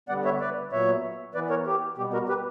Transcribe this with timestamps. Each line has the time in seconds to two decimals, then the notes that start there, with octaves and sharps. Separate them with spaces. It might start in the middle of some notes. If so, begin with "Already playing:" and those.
0.09 D3 G3 B3 D5 F#5
0.25 C#5 E5
0.40 B4 D5
0.72 A#2 F#3 B3 C#5 E5
1.34 E3 B3 B4 D5
1.50 A#4 C#5
1.67 G4
1.97 B2 G3 B3 G4
2.13 F#4 A#4
2.28 G4 B4